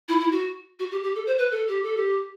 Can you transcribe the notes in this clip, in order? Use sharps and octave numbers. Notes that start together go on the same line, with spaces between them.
E4
E4
F#4
F#4
G4
G4
A4
C5
B4
A4
G4
A4
G4